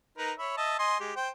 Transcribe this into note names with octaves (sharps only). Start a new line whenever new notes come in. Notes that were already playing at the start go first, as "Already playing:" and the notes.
D#4 A#4 B4
C#5 E5 B5
D#5 E5 A5
D#5 G#5 C6
G#3 G4
C5 G5